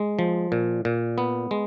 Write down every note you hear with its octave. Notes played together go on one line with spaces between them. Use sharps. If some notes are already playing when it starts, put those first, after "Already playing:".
Already playing: G#3
F3
A#2
A#2
B3
G#3